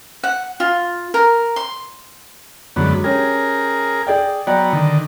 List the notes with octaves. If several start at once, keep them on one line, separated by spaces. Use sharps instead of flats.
F#5
F4
A#4
C6
F#2 D3 F#3 G#3 B3
C#4 G4 G#4 A#4
G#4 D5 G5
F#3 B3 D5 G5 A#5
D3 D#3